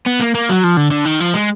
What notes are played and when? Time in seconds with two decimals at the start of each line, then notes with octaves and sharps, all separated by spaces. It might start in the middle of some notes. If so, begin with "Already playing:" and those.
0.06 B3
0.21 A#3
0.35 A#3
0.49 F#3
0.64 F3
0.77 D3
0.91 D3
1.05 D#3
1.20 F3
1.34 G#3